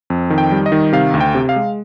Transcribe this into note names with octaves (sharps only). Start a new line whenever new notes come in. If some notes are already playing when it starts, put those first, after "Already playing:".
F2
D#3
G5
G3
D#5
D#3
C3 F5
D2
G5
C3
F5
G#3